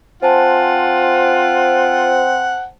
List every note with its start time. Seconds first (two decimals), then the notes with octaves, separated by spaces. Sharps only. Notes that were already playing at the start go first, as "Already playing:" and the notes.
0.23 C4 F4 C5 F#5 G#5 A5